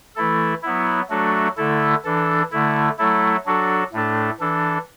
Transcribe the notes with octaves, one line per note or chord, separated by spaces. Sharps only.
E3 A3 E4 A4
F#3 B3 E4
F#3 A3 D4 F#4 A4
D3 A3 E4 A4
E3 D4 A4
D3 A3 E4
F#3 A3 E4 A4
F#3 D4 F#4 A4
A2 A3 D4 A4
E3 D4 A4